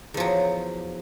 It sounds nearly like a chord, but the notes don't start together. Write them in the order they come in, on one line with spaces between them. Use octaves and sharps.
E2 F3 F#3